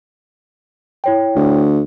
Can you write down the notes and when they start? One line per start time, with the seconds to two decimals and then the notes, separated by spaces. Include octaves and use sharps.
1.04 E4 C#5 G5
1.36 D2